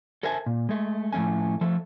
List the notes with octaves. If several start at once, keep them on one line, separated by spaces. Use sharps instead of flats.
A4 A#4 C5 E5 G#5 A5
A#2
G#3 A3
A2 F3 A3 C#4 G#5
F3 A3 A4